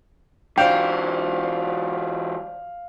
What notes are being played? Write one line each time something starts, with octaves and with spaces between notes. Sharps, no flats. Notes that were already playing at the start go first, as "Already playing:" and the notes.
E3 F#3 D4 C5 F5 G5